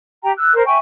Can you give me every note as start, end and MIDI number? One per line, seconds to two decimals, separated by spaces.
0.23 0.32 67
0.23 0.32 79
0.23 0.32 82
0.37 0.53 88
0.37 0.53 90
0.54 0.64 70
0.54 0.64 72
0.66 0.78 76
0.66 0.78 79
0.66 0.78 80
0.66 0.78 85